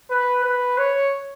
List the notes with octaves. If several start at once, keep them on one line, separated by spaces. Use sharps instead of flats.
B4
B4
C#5